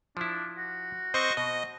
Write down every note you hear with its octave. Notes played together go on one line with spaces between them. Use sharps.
F3 D4 E4
F#4
C4 C5 D#5 C#6
B2 D#5